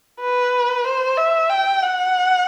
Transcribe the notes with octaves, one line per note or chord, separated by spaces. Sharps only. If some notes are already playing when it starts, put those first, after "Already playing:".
B4
C5
E5
G5
F#5